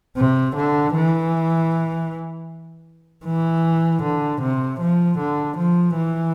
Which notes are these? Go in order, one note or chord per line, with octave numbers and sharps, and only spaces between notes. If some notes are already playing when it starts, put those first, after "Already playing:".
C3
D3
E3
E3
D3
C3
F3
D3
F3
E3